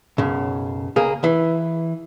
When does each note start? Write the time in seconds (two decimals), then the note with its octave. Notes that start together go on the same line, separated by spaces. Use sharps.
0.18 B1 F#2 C#3
0.96 C#2 A#3 G#4
1.24 E3